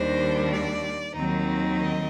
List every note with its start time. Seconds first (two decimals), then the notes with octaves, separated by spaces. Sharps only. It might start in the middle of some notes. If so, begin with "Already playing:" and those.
Already playing: D#2 D#3 G3 D4 C5
0.52 D5
1.16 D#2 D#3 F#3 C4 D#4
1.80 D#5